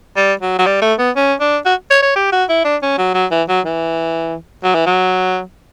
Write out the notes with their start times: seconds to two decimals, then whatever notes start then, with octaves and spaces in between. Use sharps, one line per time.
0.16 G3
0.41 F#3
0.59 F#3
0.66 G3
0.82 A3
0.99 B3
1.16 C#4
1.40 D4
1.65 F#4
1.91 C#5
2.02 C#5
2.16 G4
2.32 F#4
2.49 E4
2.65 D4
2.82 C#4
2.98 F#3
3.14 F#3
3.31 E3
3.49 F#3
3.65 E3
4.64 F#3
4.75 E3
4.86 F#3